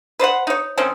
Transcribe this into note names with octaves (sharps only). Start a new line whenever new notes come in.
B4 C5 D5 F#5
D#4 C#5
D#3 C4 C#4